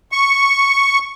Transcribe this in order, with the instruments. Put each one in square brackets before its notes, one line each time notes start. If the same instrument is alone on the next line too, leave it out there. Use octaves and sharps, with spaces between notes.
[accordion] C#6